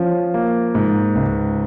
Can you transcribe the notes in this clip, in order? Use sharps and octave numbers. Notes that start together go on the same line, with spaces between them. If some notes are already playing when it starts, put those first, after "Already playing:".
Already playing: F3 C#4
A#3
G#2
C#2